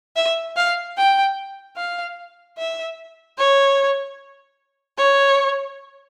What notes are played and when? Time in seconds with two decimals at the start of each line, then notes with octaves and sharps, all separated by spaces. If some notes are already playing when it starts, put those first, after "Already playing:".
0.16 E5
0.56 F5
0.97 G5
1.77 F5
2.58 E5
3.38 C#5
4.98 C#5